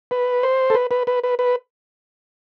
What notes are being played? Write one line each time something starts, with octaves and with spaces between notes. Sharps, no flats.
B4
C5
A4
B4
B4
B4
B4
B4